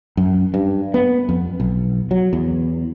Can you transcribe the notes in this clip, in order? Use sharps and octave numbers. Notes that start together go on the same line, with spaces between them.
F#2
G2
B3
F2
B1
F#3
E2